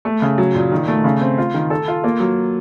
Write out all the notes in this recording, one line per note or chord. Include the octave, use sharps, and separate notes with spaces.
A3
C#3
F#3
A#2
D#3
A3
C#3
C4
F4
D#3
A4
F4
A#3
F#3